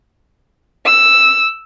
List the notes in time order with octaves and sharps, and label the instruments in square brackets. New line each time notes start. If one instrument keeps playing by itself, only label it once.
[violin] E6